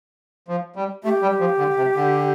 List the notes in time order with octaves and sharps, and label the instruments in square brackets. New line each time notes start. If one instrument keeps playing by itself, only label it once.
[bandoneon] F3
G3
[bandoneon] A3 [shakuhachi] G4
[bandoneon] G3
F3
D3
C3
D3